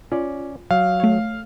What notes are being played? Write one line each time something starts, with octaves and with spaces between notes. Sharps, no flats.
C#4 F4 D5
F#3 F5
A3 C#5